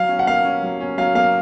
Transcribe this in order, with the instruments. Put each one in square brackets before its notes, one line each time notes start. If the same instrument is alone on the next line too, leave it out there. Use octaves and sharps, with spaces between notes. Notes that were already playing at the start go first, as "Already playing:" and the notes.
Already playing: [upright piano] F#3 [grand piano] F5
[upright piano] C#4
[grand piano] F#5
[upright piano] A#3 [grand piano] F5
[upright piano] C#4
F#3
C#4
[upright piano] F#3 [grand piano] F5
[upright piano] A#3 [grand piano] F5